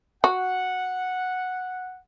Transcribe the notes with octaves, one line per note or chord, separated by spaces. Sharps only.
F#4 F#5